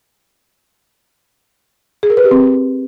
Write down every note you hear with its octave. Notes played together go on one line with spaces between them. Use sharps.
G#4
A#4
B4
G4
C4